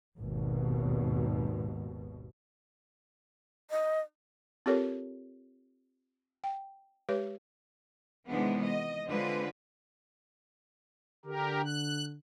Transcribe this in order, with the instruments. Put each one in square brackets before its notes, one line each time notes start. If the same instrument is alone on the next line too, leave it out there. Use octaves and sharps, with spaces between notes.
[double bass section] G#1 D#2 B2
[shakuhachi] D#5
[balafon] C4 F4 G4 A4 A#4 C#5
G5
G#3 G4 B4 C#5
[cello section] C3 D#3 E3 G#3 B3 D4
D#5
D3 G#3 C4 F4 B4
[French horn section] D3 [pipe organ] G4 A#4
[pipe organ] F#6